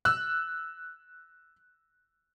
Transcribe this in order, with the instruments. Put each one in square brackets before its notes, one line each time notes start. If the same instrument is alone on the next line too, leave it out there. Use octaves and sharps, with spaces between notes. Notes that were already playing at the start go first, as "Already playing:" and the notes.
[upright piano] E6 F#6